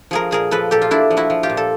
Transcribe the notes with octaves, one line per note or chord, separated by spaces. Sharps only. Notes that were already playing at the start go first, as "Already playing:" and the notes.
F3 G#4 A#4
A#2 G#4 A#4
F3 A4 B4
A#2 G4 A4
F4
A#2 D4 E4
F3
E4 F#4
F3
F4 G4
A#2
A4